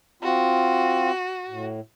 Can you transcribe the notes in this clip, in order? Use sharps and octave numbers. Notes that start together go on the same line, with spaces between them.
C4 F4 F#4
A2